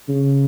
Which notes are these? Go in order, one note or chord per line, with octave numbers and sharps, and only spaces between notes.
C#3